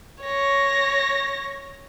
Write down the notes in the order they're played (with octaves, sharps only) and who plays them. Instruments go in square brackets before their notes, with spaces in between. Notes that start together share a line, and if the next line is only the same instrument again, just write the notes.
[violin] C#5 A#6